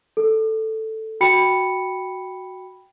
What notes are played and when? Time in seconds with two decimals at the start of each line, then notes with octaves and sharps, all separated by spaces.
0.17 A4
1.21 F#4 G5 B5 C#7